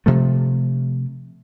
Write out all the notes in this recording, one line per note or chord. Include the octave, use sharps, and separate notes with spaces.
C3 F3 A3